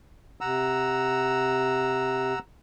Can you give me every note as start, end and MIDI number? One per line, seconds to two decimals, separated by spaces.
0.41 2.33 48
0.41 2.39 78
0.41 2.39 82
0.41 2.39 88